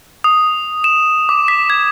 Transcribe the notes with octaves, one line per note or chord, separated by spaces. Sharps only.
D#6
E7
D6
B6
G#6